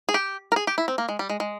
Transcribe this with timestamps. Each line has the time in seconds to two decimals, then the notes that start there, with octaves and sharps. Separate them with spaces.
0.09 G#4
0.14 G4
0.52 A#4
0.56 G#4
0.67 G4
0.78 E4
0.88 C4
0.98 A#3
1.09 G#3
1.19 G3
1.30 G#3
1.40 G#3